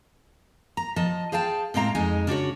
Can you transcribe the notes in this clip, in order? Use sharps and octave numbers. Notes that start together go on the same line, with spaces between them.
A#5
F3 D#5 A5
G#4 C5 F5 G5 A5
A2 G#3 C4 F5 A#5
F2 G#3 D#4 G#5
C#3 D4 F#4 C#5